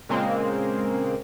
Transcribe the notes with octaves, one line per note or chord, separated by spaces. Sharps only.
A#2 C#3 G#3 A#3 C4